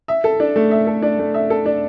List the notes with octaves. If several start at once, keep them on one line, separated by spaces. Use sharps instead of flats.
E5
A4
D4
A3
E5
A4
D4
A3
E5
A4
D4